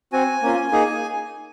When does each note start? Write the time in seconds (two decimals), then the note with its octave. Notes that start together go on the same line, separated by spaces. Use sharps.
0.13 C4 F#4 G#5
0.42 A#3 C#4 F4
0.71 A#3 D#4 G#4